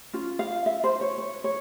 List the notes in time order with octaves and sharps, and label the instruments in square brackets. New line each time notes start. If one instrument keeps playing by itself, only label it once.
[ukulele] C#4 F4
F5
E5
C5
C#5
C#5
C#5